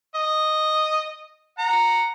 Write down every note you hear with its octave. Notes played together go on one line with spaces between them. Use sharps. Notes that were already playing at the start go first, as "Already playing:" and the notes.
D#5
F#5 A#5